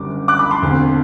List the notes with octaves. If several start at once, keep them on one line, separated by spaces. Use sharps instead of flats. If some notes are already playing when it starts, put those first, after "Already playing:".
Already playing: F#1 F#2 D3 G3 D6
D6 F#6
B5 D6
A5 C6
E1 D2 C3